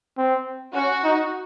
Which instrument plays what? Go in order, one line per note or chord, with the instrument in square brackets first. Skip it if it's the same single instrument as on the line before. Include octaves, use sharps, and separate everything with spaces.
[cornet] C4
[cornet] C#4 [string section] F#4
[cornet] D#4